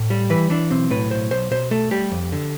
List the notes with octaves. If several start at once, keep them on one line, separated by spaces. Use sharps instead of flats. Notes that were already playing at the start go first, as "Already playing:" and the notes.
Already playing: A2
G3
E3 B4
E3 D4
B1 C4
A2 B4
B1 C5
B1 C5
B2 C5
A3 A4
G3 G4
F2
D3